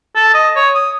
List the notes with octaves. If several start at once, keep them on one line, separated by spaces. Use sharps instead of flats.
A4
D#5
C#5
D#6